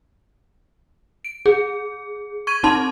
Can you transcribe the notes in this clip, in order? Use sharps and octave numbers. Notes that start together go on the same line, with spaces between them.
D7
G#4
C#6 G#6 D#7
C4 D#4 A5 C6